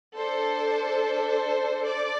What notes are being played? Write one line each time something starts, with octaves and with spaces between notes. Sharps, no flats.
D4 A4 C5
C5
D5